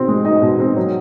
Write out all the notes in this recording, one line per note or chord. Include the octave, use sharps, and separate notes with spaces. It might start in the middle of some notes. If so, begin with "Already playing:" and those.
Already playing: B2 C4 D#4
G#3
D#4 D#5
B2
C4
F#3